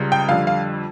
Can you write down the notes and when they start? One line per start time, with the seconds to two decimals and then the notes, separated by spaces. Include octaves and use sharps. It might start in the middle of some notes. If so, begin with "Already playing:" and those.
Already playing: C#2 C#3 G3
0.12 G5
0.29 F2 D3 G3 F5
0.47 F5